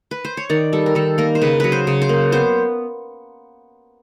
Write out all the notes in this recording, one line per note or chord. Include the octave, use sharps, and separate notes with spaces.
B4
C5
C#5
D#3 D5
G3 A4
A#4
D#3 A4
A#3 A#4
C5
C#3 B4
F#3 B4
C5
C#3
C5
A#3
B3 C5